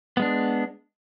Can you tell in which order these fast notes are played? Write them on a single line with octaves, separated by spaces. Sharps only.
B3 G#3 D4